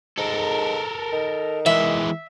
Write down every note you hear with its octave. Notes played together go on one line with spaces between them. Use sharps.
G#2 A4 A#4
D#3
E3 G#3 E5